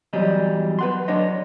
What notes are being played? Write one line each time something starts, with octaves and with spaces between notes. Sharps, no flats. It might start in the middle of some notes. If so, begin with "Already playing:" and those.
E2 F#3 G3 D#5
B4 F#5 C6
F#3 D4 C#5 D#5